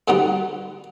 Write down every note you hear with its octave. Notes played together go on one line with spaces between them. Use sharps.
G#2 D3 G3 B3 D#4 F#4